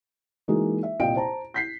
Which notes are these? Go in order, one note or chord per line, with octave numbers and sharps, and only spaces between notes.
E3 G#3 A#3 D#4 F#4 G#4
E5
C2 A#2 D#5 F5 G5 D7
C5 A5 A#5
G6 B6 C7